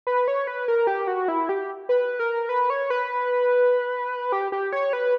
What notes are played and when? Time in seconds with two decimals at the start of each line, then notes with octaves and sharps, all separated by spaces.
0.07 B4
0.28 C#5
0.47 B4
0.68 A#4
0.87 G4
1.07 F#4
1.28 E4
1.49 G4
1.89 B4
2.20 A#4
2.49 B4
2.70 C#5
2.90 B4
4.32 G4
4.52 G4
4.73 C#5
4.93 B4